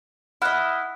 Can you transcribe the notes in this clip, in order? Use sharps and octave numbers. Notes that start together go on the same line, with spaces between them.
E4 D#5 F#5 F6 F#6